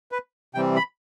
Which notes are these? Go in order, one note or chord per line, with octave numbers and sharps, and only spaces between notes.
B4
C3 E3 G3 C4 G5
B5